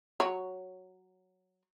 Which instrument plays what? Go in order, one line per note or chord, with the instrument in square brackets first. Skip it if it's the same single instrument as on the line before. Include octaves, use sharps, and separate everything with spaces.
[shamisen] F#3 C#5